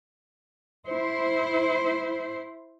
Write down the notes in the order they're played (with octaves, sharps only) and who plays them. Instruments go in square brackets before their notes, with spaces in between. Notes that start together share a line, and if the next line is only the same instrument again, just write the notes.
[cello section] E4 C5